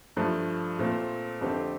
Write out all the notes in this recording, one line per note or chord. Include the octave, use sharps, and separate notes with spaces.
G2 F3 A3
A#2 A3 C4
F2 D3 A3 C4 G4